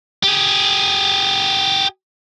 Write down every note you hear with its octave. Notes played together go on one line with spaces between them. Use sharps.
G4 G#4